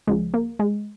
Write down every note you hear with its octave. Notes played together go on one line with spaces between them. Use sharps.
C#2 C#3 F3 G#3
A#3
G#3